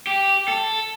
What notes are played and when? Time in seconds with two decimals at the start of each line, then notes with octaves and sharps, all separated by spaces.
0.07 G4
0.48 A4